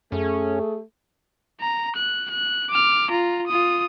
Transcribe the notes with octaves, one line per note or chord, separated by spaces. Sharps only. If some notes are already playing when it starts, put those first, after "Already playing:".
F#2 A3 C#4 G#4
A#5
F#6
F#6
D6 F6
F4 A#5
F4 D#6